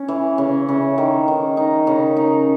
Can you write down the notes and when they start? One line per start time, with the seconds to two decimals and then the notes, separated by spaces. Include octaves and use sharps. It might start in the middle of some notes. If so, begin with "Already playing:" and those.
Already playing: C#4
0.08 E3
0.38 C#3
0.69 C#3
0.98 D#3
1.28 D#3
1.57 D#4
1.87 C#3
2.17 D#4